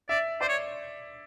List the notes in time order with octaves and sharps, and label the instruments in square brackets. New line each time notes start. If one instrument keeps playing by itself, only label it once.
[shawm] D5 [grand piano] E5
[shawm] C5 [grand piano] D5
[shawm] C#5